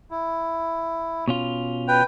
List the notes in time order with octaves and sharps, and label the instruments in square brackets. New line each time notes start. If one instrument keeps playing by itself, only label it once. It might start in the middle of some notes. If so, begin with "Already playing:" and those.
[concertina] E4
[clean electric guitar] B2 C#4 F4
[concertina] B4 G5